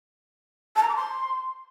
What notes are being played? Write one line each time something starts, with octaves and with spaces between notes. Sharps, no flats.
A5
A#5
D6
C6